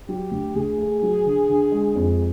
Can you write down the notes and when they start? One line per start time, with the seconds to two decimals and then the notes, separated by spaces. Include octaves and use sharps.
0.09 F#3 G4
0.31 D2
0.55 D2 G#4
0.78 A3
1.02 F#3
1.26 D3
1.49 D3
1.72 G#3
1.95 F2